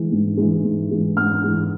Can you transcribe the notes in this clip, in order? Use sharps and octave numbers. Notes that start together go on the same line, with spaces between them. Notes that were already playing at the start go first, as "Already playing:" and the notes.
Already playing: E3 G#3
G#2
E3 G#3
G#2
E3 G#3
G#2 F6
E3 G#3